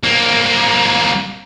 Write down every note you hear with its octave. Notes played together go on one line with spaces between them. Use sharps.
C2 A#3